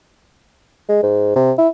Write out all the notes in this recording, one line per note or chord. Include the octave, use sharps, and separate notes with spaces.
G#3
G#2
C3
E4